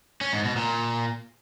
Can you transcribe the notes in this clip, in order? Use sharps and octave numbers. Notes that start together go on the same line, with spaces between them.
C#4
G#2
B2
A#2